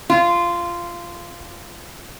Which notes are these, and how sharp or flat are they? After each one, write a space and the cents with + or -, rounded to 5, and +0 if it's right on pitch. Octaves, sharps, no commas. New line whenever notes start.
F4 -15